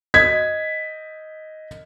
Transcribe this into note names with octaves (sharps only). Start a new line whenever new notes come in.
D#5 G#6 B6